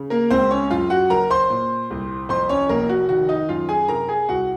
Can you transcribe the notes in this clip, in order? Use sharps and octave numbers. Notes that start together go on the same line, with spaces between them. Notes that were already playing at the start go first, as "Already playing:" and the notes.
Already playing: C#3
A#3 A#4
C#2 C4 C5
C#4 C#5
F#2 F4 F5
F#4 F#5
F#1 A#4 A#5
C5 C6
A#2
C2
F2 C5 C6
C#4 C#5
F1 A#3 A#4
F#4
D#3 F#4
D#4 D#5
F#2 F4 F5
G#4 G#5
C3 A#4 A#5
G#4 G#5
C2 F#4 F#5